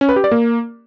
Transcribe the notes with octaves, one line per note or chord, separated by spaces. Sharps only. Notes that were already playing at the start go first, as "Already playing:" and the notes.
C#4
B4
G4
D5
A#3